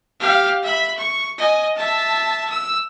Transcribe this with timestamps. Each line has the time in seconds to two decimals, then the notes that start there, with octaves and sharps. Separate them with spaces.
0.20 G4 F5
0.63 E5 B5
0.98 C#6
1.38 D#5 G#5
1.76 E5 A5
2.50 E6